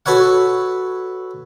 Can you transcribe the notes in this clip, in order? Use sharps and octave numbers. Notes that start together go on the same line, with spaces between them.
F#4 A4 B4 C#5 F#5